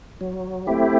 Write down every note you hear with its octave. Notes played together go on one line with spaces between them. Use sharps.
F#3
A3 C4 E4 G4